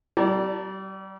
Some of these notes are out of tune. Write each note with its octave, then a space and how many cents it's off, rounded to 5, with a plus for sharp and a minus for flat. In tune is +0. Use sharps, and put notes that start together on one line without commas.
G3 -35 D5 +0 A5 +35